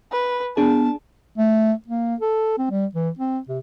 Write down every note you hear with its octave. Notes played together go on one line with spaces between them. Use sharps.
B4
B3 D4 G#4 A5
A3
A#3
A4
C4
G3
E3
C4
C3